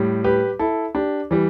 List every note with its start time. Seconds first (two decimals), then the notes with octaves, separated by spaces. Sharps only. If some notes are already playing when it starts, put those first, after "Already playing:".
Already playing: A2 G3
0.24 G4 B4
0.59 E4 A4
0.95 D4 G4
1.31 E3 G3